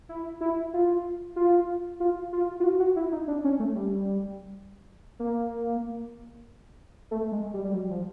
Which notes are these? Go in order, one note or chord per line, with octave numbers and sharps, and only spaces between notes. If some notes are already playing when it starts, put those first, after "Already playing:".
E4
E4
F4
F4
F4
F4
F4
F#4
F#4
E4
D#4
D4
C#4
A3
G3
A#3
A3
G#3
G3
G3
F#3
F3